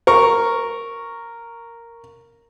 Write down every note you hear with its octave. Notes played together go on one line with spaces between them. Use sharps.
A#4 C#6